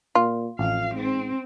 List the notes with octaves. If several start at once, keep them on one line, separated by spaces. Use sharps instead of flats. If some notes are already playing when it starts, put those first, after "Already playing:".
A#2 F4
A1 F2 F5
G#2 C4